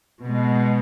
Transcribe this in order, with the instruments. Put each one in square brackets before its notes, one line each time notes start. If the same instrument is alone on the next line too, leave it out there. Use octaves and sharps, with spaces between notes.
[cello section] B2 G#3